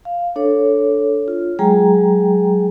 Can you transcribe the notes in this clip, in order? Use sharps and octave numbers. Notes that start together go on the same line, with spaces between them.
F5
D4 A4 C#5
F4
F#3 G#3 G#4 G5 A#5